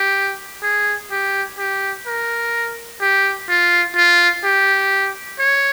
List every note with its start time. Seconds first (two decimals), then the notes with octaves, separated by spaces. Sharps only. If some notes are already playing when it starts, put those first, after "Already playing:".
Already playing: G4
0.63 G#4
1.11 G4
1.59 G4
2.07 A#4
3.01 G4
3.49 F4
3.96 F4
4.44 G4
5.39 C#5